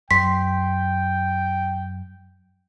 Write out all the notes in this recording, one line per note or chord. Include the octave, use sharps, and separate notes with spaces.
F#2 G5 C6 B6